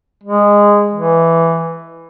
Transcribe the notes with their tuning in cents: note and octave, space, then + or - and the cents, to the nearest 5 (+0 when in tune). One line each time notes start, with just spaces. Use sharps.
G#3 -15
E3 +5